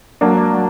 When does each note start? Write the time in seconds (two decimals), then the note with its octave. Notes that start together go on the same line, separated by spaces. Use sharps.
0.21 F#3 A#3 D4
0.53 F#3